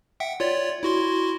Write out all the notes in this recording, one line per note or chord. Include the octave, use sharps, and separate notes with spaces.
E5 F#5 G5
F4 C#5 D5
E4 F#4 C6